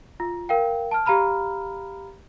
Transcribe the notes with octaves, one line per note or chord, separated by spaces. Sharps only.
F4
A#4 F5 G5
A5 F6
G4 F5 A#5 B5 F6